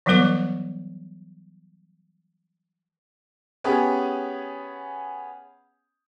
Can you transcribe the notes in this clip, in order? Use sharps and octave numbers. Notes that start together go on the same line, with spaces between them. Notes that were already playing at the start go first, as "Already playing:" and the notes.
E3 F#3 G3 B3 A#4 D6
B3 C#4 G4 G#4